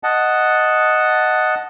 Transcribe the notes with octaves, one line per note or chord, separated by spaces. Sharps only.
D#5 F#5 A5